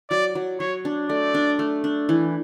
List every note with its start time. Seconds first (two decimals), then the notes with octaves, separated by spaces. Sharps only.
0.11 F#3 D5
0.35 F#3
0.60 F#3 C#5
0.85 D4
1.09 A3 D5
1.34 D4
1.59 A3
1.84 D4
2.09 E3